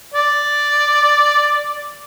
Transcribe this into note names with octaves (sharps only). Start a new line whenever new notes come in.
D5